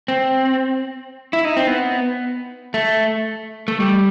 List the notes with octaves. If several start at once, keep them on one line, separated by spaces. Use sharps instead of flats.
C4
E4
D#4
C4
B3
A3
A3
G3